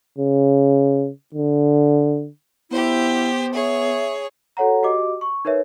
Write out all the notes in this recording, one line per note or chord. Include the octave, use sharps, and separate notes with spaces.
C#3
D3
B3 E4 G4 C5
G#4 C#5 E5
F#4 A4 C#5 F#5 A#5
F#4 G4 D#5 D6
C#6
D#4 A#4 B4 C#5 E5